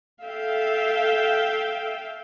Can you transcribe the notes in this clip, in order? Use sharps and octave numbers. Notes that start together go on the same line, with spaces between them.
A4 E5 F5 G5